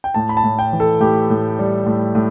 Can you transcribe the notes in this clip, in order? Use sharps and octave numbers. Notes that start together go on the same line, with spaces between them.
G5
A2 A5
B5
A5
A2
G5
E3
A4
A2 G4
A2
G3
A2
A2